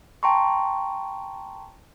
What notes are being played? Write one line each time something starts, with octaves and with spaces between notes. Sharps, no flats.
G5 A5 A#5 C6 C#6